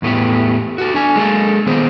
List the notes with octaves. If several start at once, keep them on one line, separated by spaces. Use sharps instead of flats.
E2 A2 A3 B3 G4
F#4 A4
D4 G#5
G#3 A#3 A4
D#3 B3 G#4 C5